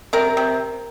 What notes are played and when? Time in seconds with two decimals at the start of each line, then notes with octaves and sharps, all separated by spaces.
0.13 C3 A#4
0.37 C3